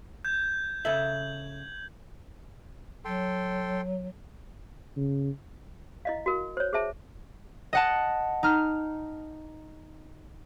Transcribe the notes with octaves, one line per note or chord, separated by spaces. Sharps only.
G6 G#6
C#3 A4 E5 G6 G#6 F#7
F#3 A4 G5 C6
C#3
E4 D#5 F5
F#4 A#4
C5 C#5
G#4 C5 E5 A5
D#5 F#5 A5
D#4 F6